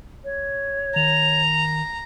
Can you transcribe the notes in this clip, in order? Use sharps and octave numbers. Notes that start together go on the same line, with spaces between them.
C#5
D#3 A#5 F7